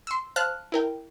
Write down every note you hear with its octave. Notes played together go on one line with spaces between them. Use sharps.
C6 E6
C5 F5 A5 F6 F#6
E4 A#4 G5